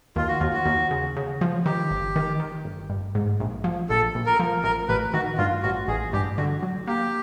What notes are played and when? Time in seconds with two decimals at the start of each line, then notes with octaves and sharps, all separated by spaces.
0.16 D#2 F4
0.28 F#4
0.38 F4
0.41 D#2
0.53 F#4
0.66 D#2
0.91 C#3
1.16 C#3
1.41 F3
1.65 D#3 G4
1.91 G1
2.16 D#3
2.40 D#3
2.64 G1
2.90 G2
3.15 G#2
3.40 A#1
3.64 F3
3.89 A#1 A4
4.15 A#1
4.26 A#4
4.39 F3
4.63 A1 A#4
4.89 A1 B4
5.13 D#3 F#4
5.38 G2 F4
5.63 A1 F#4
5.88 A1 G#4
6.13 G2 G4
6.37 D3 F#4
6.62 F#3
6.87 A#3 G4